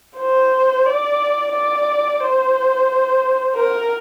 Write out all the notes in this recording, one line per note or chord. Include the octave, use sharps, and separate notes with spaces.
C5
D5
D5
C5
A#4